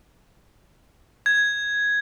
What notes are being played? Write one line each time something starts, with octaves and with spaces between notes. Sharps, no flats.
G#6